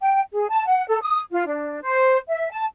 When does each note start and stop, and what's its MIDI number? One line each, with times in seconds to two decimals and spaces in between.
0.01 0.20 79
0.32 0.48 68
0.49 0.65 81
0.66 0.85 78
0.86 1.00 69
1.01 1.20 87
1.30 1.43 65
1.46 1.77 62
1.81 2.17 72
2.27 2.50 76
2.51 2.65 81